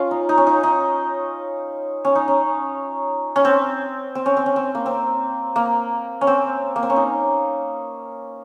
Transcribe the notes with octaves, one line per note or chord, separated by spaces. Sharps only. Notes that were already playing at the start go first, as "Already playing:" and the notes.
Already playing: C#4 F4
D#4
D#4
C#4
D#4
D#4
C#4
D#4
C#4
C#4
C4
C4
C#4
C4
C#4
C4
A#3
C4
A#3
C#4
C4
A#3
C4
C#4
D#4